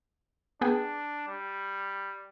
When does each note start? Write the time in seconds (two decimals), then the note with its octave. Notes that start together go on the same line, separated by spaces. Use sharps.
0.61 B3 D4 G#4 G5
1.28 G3